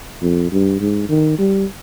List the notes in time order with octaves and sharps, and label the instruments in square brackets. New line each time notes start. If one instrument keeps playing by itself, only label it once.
[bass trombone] F2
G2
G#2
D#3
G3